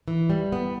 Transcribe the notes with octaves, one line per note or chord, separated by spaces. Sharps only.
E3
G3
B3